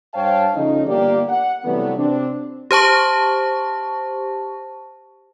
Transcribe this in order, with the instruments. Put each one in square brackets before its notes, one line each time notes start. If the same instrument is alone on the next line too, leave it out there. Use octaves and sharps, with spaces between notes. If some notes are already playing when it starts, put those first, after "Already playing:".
[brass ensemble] G2 C5 C#5 F5 G5 A5
C#3 F3 A3 C#4 D#4
G1 A#3 G4 D5
F#5
C3 E3 F#3 G3 A3 B3
C3 C4 D4
[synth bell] G4 C5 A5 C#6